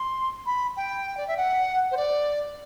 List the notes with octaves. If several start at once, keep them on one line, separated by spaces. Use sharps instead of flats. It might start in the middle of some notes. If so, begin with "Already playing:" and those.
Already playing: C6
B5
G5
D5
E5
F#5
C5
D5